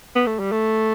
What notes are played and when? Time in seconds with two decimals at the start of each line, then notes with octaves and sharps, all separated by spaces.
0.15 B3
0.27 A3
0.39 G3
0.52 A3